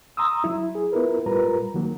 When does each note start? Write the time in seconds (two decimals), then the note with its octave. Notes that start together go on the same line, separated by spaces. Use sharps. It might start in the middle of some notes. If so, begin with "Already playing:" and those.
0.17 A#5 C6 D#6 E6
0.44 F#3 E4
0.75 G#4
0.92 B3 E4 F4 A#4 B4
1.26 A2 G3 F4 A#4 B4 A#5
1.74 D#3 F#3 A#3